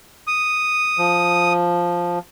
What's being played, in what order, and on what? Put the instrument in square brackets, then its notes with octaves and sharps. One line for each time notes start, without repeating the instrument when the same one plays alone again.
[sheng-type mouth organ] D#6
[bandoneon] F3